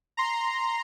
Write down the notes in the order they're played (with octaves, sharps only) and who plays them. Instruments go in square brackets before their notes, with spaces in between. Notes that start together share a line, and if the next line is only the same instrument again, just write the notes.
[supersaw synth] A#5 C6